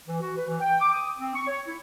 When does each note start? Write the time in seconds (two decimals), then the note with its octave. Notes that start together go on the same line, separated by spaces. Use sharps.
0.07 E3
0.21 F#4
0.36 B4
0.47 E3
0.61 G5
0.80 D6
0.93 D#6
1.19 C4
1.35 C#6
1.47 C#5
1.67 E4